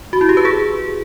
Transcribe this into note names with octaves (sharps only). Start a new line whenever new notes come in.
F#4
E4
G4
B4
G#4